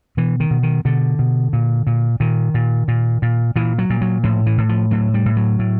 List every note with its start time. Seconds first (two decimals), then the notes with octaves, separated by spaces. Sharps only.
0.17 B2 E3
0.40 D#3
0.51 B2
0.63 D#3
0.85 B2 D3
1.19 B2
1.53 A#2
1.87 A#2
2.20 A#2 D#3
2.54 A#2
2.88 A#2
3.22 A#2
3.56 A#2 E3
3.78 F#3
3.90 A#2
4.01 F#3
4.23 A2 F3
4.46 E3
4.58 A2
4.69 F3
4.91 A2 F#3
5.14 G3
5.26 A2
5.37 F#3
5.59 A2